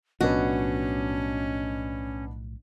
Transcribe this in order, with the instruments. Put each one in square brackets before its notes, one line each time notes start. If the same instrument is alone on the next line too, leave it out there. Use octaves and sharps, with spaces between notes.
[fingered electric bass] B1 A2 F3 [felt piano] B3 D4 D#5 [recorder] C#4 [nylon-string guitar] F#4